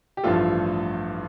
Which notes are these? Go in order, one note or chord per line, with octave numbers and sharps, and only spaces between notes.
G4
A1 G2 F3 A3 F4 A4